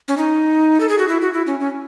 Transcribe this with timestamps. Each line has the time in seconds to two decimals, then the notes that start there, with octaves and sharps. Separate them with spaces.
0.08 C#4
0.17 D#4
0.80 A4
0.89 G#4
0.99 F#4
1.08 E4
1.22 F#4
1.33 E4
1.47 C#4
1.60 C#4